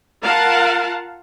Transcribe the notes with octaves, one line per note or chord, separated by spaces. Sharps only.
F4 A#4 F5 F#5 A5